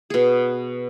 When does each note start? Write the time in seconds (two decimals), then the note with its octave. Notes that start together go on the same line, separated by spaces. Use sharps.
0.10 B2 G#4